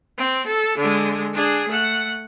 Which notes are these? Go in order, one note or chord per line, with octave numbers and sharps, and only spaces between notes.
C4
A4
D3 G#3
D4 G#4
A3 F#5